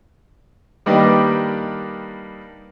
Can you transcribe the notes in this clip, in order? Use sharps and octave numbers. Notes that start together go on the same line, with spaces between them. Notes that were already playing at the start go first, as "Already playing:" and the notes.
D#3 G3 A#3 D4 B4 D#5